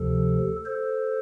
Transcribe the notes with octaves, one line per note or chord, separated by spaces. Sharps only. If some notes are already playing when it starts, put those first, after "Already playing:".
Already playing: D2 C3 F3 A4
A4 C5